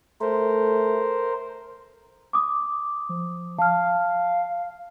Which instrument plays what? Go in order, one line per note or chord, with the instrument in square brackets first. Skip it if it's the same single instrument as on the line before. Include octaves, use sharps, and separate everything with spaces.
[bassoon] A3 [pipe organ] A#4 C5
[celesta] D6 D#6
[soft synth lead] F3
[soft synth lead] F5 [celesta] A5 F6